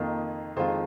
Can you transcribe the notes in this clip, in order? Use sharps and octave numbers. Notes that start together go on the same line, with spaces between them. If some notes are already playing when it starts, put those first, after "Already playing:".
Already playing: F2 D#3 A#3 F4
F2 D#3 G#3 F4 C5